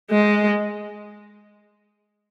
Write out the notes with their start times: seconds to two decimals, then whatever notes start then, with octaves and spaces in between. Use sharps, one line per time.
0.11 G#3